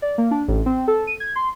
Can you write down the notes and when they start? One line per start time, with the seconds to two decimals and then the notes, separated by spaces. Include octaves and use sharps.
0.02 D5
0.18 A#3
0.31 D4
0.48 A1
0.66 C4
0.88 A4
1.07 D#7
1.20 G#6
1.36 C6